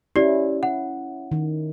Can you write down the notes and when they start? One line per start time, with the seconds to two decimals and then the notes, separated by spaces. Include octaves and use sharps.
0.16 C#4 E4 G4 D5
0.63 F#5
1.31 D#3